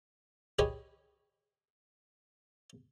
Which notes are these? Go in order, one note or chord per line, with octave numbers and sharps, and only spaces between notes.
G4 G#4 B4 C#5 D#5 G#5